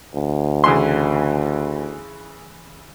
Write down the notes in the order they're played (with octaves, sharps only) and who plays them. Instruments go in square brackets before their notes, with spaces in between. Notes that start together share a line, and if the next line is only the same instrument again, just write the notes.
[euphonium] D2
[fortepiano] C#3 E3 C6